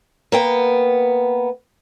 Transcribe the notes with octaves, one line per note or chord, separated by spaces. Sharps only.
A#3 B3 G5